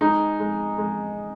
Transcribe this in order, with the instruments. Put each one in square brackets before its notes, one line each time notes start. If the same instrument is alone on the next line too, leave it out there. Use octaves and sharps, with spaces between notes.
[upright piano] G#3 [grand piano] D#4
[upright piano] G#3
G#3